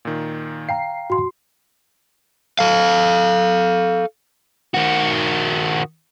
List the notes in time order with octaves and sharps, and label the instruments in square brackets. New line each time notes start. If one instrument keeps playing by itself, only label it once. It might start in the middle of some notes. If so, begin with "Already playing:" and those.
[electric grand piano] A#2 D#3
[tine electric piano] F5 G5 A#5 [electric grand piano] C7
[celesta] F#4 C6
[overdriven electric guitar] A4 F5
D#3 F#4